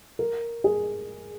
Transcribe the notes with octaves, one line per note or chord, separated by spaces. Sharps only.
A#4
G#4